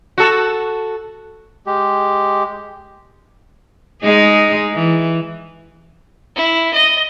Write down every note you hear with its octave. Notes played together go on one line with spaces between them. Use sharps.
F#4 A4
G#3 G4
G#3 D#4 G#4
E3
E4
D#5